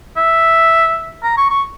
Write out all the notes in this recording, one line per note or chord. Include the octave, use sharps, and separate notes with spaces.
E5
A#5
C#6
C#6